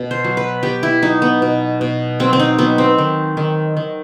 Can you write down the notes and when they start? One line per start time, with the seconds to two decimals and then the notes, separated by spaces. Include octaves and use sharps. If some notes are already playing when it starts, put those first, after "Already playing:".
Already playing: B2
0.11 C5
0.24 F#3
0.37 B4
0.63 B3 G4
0.83 E4
1.02 F#3 D#4
1.22 B3
1.42 B2
1.81 B2
2.20 F#3 C4
2.33 C4
2.39 D#4
2.58 F#3 B3
2.78 C4
2.98 D#3
3.37 D#3
3.77 D#3